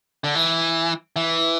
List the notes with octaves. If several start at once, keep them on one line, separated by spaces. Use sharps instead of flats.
D3
E3
E3